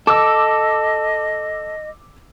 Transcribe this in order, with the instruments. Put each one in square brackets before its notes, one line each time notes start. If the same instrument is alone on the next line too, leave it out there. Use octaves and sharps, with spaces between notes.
[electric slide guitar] A4 [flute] D#5 [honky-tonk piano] D6 E6